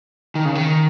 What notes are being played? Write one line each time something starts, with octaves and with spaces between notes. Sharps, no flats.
D#3
C#3
D#3